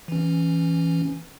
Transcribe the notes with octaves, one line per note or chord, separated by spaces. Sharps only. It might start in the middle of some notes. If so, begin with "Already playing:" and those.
E3 C#4